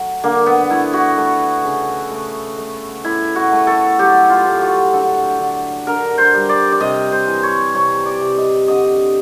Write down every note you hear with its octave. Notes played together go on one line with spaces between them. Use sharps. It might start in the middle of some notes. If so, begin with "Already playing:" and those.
Already playing: F#3 A3
D3 A#3
B3
A3 E4
F#4
A3
C#3
A3
A3
A2 E4
F#4
A3
A4
F#3 G4
F4
A2
F#4
D3 A4
D3
D3 A#4
C5
G3
D5
D5
C3 D#5
C5
E3
C#5
C3 C#5
D5
C3
D#5
D3 D#5